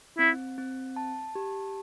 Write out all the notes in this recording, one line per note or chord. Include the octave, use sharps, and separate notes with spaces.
C4 E4
C4
A5
G4